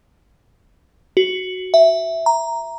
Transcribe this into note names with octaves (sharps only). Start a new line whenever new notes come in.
F#4
E5
A#5